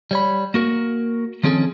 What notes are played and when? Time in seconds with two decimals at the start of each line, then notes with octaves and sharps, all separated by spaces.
0.11 G3 C#5 B5
0.54 A#3 F#4 A#4
1.43 D#3 F3 C4 C#4 G#4 A4